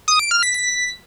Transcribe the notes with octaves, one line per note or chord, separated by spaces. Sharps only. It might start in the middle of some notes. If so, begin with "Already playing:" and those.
D#6
D7
F6
B6
B6